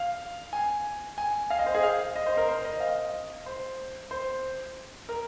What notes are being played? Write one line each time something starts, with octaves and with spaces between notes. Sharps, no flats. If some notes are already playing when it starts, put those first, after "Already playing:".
Already playing: F5
G#5
G#5
F5
D#5
C5
G#4
F5
D#5
C5
A#4
C5
D#5
F5
C5
C5
A#4